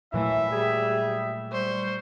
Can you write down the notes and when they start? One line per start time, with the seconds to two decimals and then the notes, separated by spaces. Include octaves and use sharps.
0.14 A#2 E3 F#3 A3 E5
0.52 G3 G#4
1.52 G3 C5 C#6